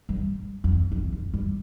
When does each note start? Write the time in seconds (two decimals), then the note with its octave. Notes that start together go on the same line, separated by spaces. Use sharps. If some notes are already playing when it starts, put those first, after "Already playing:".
0.09 G2
0.64 F2
0.92 F2
1.12 F2
1.34 G2